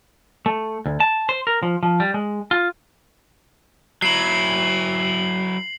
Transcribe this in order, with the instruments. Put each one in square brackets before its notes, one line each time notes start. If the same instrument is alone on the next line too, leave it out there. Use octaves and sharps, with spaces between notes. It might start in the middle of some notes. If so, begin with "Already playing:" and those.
[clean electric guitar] A3
D2
A5
C5
A#4
F3
F3
G3
G#3
F4
[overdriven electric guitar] F#3 E4 [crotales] C7 F#7